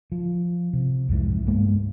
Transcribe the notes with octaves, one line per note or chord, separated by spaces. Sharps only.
F3
C3
C2 F2 G#2 E3
G2 G#3 A#3 B3